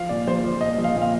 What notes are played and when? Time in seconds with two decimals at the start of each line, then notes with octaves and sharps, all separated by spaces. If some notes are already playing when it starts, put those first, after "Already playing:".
Already playing: F3 F5
0.09 A#2 D5
0.27 F3 C5
0.44 F3
0.61 A#2 D#5
0.78 F3
0.84 F5
0.96 A#2
1.02 F5